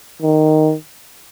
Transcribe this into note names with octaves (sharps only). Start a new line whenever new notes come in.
D#3